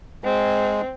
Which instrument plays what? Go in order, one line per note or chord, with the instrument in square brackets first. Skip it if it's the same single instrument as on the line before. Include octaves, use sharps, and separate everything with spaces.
[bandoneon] G#3 [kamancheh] C4